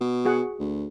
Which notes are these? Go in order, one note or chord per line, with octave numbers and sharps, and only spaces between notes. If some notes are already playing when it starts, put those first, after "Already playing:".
B2
F#4 G#4 F#5
D2